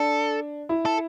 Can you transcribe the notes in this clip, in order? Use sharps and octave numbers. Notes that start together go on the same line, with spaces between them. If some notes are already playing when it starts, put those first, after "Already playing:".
Already playing: D4 A4
E4
A4